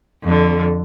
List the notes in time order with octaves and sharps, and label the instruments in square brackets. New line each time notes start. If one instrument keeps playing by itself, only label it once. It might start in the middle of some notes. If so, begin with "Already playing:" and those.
[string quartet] F2 D3